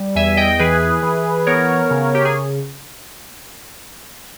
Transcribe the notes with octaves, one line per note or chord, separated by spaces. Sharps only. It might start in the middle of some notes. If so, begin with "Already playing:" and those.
Already playing: G3
E2 E5 G#5
D#5 G5
E3 G#4 B4
E3
B3 A#4 C#5
C#3
G4
G#4